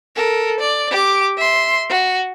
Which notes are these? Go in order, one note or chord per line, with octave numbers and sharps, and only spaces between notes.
A4 A#4
D5
G4 D6
E5 C6
F#4